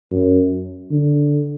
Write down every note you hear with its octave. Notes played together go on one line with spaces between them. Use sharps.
F#2
D3